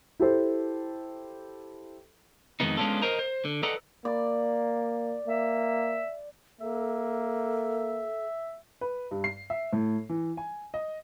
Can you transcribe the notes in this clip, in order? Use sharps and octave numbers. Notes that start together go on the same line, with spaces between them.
E4 G4 A4 C5
F2 B2 D#3 G#3 B3 D#4
G#3 B3 C#4 D4 F4 A4
A#4 C5 D#5 A#5
C5
D3
A4 B4 D5 D#5 F#5 A#5
A#3 D5
A#3 E5
A#3 A4 E5
B4
G2
C7
E5
A2
E3
G#5
D#5